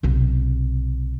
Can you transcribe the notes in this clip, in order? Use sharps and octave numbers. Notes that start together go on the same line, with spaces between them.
B1 C3